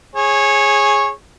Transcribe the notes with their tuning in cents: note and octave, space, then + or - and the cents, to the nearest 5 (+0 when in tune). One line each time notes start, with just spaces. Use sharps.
G#4 +0 C#5 -15